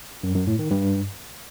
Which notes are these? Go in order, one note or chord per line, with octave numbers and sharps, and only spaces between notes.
F#2
F#2
A2
D#3
G2